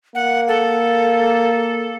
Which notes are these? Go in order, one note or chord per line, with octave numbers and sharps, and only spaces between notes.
A#3 F#5
A4